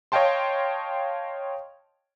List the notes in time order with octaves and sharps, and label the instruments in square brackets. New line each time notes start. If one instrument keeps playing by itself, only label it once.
[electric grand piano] C#5 D#5 F5 G5 A5 C6